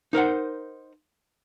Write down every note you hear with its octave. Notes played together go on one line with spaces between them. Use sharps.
D#4 A#4 C5 F#5